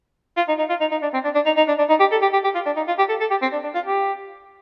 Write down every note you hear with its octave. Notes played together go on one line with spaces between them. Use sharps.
F4
D#4
D#4
F4
D#4
D#4
D4
C4
D4
D4
D#4
D#4
D4
D4
D#4
G4
A4
G4
G4
G4
F4
D4
D#4
F4
G4
A4
A4
G4
C4
D4
D4
F4
G4